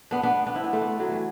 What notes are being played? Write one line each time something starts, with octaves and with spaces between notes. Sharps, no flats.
B3 D4
B3 D4
B3 D4
C4 E4
B3 D4
A3 C4
B3 D4
F#3 A3
E3 G3